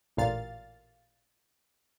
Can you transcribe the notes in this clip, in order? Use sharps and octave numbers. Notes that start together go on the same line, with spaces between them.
A1 A#2 F5 A6